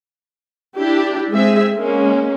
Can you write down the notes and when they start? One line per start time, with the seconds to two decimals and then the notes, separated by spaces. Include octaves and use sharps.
0.76 D4 E4 G4
1.32 G#3 C4 G#4 E5
1.75 G#3 A#3 C#4